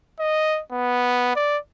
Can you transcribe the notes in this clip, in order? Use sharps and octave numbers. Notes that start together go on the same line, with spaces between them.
D#5
B3
D5